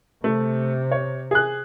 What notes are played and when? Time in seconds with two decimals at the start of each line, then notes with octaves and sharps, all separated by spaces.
0.24 C3 A3
0.92 C#5
1.31 G#4 F#6